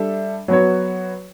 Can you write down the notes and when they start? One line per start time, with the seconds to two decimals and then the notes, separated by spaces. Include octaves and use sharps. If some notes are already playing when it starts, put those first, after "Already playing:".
Already playing: G3 D4 A4 E5
0.48 F#3 B3 F#4 C#5